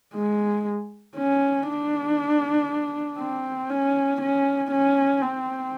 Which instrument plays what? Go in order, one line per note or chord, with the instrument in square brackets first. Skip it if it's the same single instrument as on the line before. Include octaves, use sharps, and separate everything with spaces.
[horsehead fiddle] G#3
C#4
D4
C4
C#4
C#4
C#4
C4